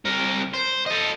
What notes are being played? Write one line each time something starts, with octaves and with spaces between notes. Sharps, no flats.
C2 A#4
C5
A4 D#5